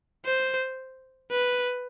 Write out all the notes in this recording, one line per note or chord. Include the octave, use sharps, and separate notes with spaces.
C5
B4